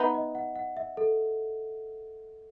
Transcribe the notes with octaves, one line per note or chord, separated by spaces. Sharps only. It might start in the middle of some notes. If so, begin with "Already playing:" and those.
Already playing: B3 D#4 E5
D#5
F#5
F#5
E5
A4